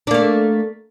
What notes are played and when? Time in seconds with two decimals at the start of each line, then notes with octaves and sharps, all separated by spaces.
0.07 D4
0.11 A#3
0.14 A3